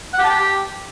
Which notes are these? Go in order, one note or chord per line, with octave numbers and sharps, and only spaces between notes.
F#5
G4
A5
G4